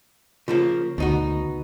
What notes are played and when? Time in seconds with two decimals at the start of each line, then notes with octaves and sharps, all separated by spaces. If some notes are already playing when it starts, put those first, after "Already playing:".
0.48 C#3 F3 A#3 F4
0.98 D2 B2 D#4 F#4